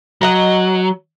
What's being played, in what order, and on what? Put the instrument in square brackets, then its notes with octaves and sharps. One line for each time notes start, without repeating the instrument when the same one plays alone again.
[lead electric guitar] F#3 [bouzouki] D#5 F#5 A#5